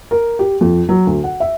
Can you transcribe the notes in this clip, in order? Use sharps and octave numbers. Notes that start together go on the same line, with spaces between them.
A#4
G4
F2
F#3
D2
F#5
E5